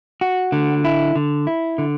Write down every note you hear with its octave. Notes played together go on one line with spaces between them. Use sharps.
F#4
D3
E4
D3
E4
D3